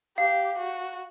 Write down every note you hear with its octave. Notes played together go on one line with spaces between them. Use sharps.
G4 F5
F#4